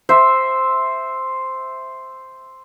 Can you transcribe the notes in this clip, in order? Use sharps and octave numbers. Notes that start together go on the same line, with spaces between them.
C5 E5